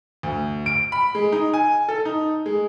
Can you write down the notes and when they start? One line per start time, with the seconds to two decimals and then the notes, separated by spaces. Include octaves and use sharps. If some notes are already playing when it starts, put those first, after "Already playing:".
0.23 D2
0.66 D7
0.92 B5
1.15 G#3
1.32 D#4
1.54 G#5
1.89 A4
2.05 D#4
2.46 G#3